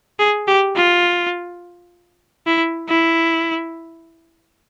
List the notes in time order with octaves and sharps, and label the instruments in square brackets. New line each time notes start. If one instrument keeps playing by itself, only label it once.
[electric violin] G#4
G4
F4
E4
E4